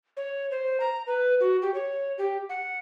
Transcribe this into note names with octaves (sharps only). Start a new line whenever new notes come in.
C#5
C5
A#5
B4
F#4
G4
C#5
G4
F#5